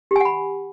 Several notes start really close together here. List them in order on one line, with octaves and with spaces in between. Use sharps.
G4 G#5 F#5 B5